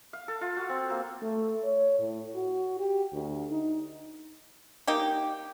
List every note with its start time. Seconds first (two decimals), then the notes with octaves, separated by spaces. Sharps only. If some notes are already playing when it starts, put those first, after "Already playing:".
0.13 F5
0.28 A4
0.41 F4
0.57 F#4
0.69 C4
0.90 A#3
1.22 A3
1.63 C#5
1.99 A2
2.36 F#4
2.79 G4
3.13 D2
3.51 D#4
4.87 A#3 D#4 G4